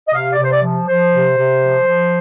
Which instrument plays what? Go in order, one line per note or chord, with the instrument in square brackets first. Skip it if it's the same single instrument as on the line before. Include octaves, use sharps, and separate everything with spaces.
[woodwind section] D#5
C3 F5
D5
C3
C5
D5
F3
F3 C5
C3
C3
F3
F3